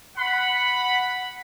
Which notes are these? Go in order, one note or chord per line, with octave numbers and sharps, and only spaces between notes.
F#5 B5